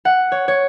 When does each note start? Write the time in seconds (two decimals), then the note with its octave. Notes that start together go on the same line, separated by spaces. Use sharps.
0.05 F#5
0.32 C#5
0.48 C#5